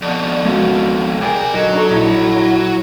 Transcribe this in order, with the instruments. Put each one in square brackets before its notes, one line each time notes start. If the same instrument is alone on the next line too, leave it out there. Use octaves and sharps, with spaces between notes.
[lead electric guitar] F2 B2 [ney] D5
[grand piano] C#2 A#3 [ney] F#4
[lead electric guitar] C2 A#4 [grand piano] G#4 D5 G5 [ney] G#5
[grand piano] B1 D3 [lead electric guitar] F#3 [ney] D#5
[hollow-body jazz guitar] D4 D#4 A4 [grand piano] C#6
[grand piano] A#1 [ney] E4